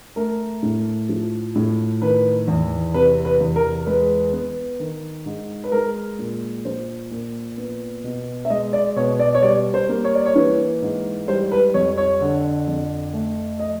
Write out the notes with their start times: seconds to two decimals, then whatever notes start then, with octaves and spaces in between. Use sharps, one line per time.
0.16 A3 A#4
0.63 A2
1.09 F3
1.55 A2
2.02 D#3 B4
2.48 E2
2.94 C3 B4
3.25 B4
3.40 E2
3.56 A#4
3.87 G#3 B4
4.33 B3
4.80 D#3
5.26 G#2
5.64 B4
5.72 G#3 A#4
6.19 A#2
6.65 F3 C5
7.11 A#2
7.57 B3
8.04 B2
8.45 E5
8.50 G#3 D#5
8.73 D5
8.96 B2 C#5
9.19 D5
9.35 C#5
9.43 G3 D5
9.74 C5
9.89 A#3
10.04 C#5
10.15 D5
10.26 C#5
10.36 E3
10.82 G#2
11.28 G3 C5
11.52 B4
11.74 F2 C#5
11.98 C#5
12.21 D3
12.67 F2
13.13 A3
13.60 D#5